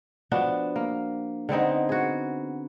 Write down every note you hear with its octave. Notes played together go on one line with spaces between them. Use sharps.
F3 B3 D4 F#4
A#3
D3 B3 C4 D#4
F#4 G#4